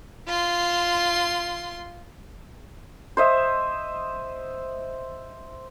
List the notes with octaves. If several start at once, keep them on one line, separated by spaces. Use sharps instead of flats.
F4 C6
C5 D#5 E5